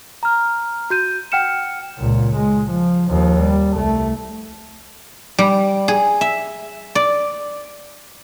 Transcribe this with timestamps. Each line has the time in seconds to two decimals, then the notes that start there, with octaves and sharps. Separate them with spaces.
0.23 A#5 F6
0.90 F#4 G6 D#7
1.32 F#5 G5 F6 C#7 E7
1.98 C#2 A#2
2.36 G#3
2.71 F3
3.10 D#2 F3
3.41 G3
3.75 C2 A3
5.39 G3
5.88 G#4
6.21 E5
6.95 D5